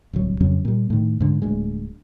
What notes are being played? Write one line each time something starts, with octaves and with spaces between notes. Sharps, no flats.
D1 C2 F#3
F2 C#3 F#3 C#4
A#2 G3
A2 D#3
G#2 D3
D1 D2 G#3